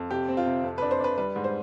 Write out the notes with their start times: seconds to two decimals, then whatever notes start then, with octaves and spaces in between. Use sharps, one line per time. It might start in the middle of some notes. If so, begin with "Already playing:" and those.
Already playing: F2
0.11 C3 G4
0.28 C4
0.37 F4
0.46 C3
0.64 F2
0.78 D4 B4
0.91 C5
1.00 D4 B4
1.18 G3 B4
1.36 G#2
1.44 C5